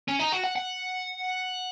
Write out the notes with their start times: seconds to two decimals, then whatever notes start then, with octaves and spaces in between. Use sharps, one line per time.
0.08 C#4
0.19 D#4
0.32 F#4
0.44 F#5
0.56 F#5